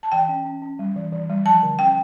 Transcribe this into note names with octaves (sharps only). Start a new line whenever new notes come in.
A5
E3 G5
C#4
C#4
C#4
G3
E3
E3
G3
F3 A5
D3
C#4 G5